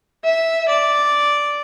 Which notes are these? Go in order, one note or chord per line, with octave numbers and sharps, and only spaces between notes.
E5
D5